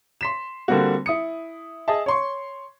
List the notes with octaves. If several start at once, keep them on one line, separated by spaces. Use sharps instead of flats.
C6 B6 E7
D3 G3 A#3 C4 F#4
E4 D#6 C#7
G#4 D#5 E5 A5
C#5 C6 C#6